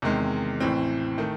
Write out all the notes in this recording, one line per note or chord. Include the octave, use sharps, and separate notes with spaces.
E2 C3 D#3 G#3
A1 A2 E3 C4
D#3 A3